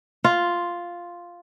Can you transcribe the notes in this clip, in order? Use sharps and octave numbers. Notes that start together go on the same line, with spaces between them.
F4